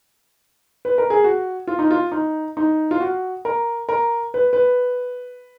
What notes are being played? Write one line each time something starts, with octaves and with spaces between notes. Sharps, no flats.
B4
A#4
G#4
F#4
F4
D#4
F4
D#4
D#4
F4
F#4
A#4
A#4
B4
B4